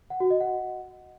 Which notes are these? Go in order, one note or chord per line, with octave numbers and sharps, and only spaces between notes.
F#5
F#4
D#5
F#5